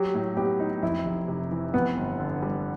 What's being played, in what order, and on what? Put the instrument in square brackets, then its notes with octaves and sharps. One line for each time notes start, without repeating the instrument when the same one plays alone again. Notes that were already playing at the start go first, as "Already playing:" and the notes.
Already playing: [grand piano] F#3 [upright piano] G4
[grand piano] A2
[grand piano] B3 [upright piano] G4
[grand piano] D#4
[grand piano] F2 [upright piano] E4
[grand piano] F1
C3
E3
[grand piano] F2 [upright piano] B3
[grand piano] G1
D3
G3